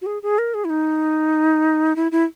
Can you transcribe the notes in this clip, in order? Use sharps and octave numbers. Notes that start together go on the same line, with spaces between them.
F#4
G#4
G#4
A#4
G#4
E4
D#4
E4
E4